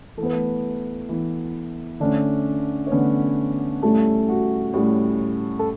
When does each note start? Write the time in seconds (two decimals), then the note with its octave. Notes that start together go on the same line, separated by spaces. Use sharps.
0.17 E3 A4
0.23 B3 B4
0.32 A3 A4
1.09 E3 B3
2.00 D3 A3 C#4 D4 D5
2.87 C#5
2.91 D3 A3 B3 C#4 B4
3.82 A2 G3 A3 C#4 A4
4.29 F#4
4.74 A2 G3 C#4
5.59 A4